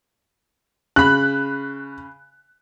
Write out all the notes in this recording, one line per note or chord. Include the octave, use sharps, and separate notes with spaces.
C#3 B5 F#6